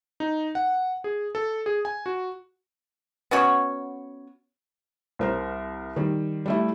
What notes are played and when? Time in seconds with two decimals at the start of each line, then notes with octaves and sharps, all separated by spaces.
0.20 D#4
0.55 F#5
1.04 G#4
1.35 A4
1.66 G#4
1.85 G#5
2.06 F#4
3.31 B3 C#4 F#4 C#5
5.19 C2 A#4 C5
5.96 D#3 G3
6.46 G3 A3 E4